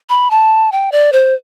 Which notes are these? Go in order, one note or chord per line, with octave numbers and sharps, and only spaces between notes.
B5
A5
G5
D5
C5